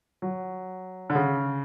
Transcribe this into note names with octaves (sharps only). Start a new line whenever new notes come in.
F#3
D3
C#3